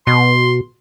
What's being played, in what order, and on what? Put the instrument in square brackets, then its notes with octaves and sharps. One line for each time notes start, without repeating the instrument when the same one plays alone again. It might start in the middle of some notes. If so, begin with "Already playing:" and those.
[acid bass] B2 [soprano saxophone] C6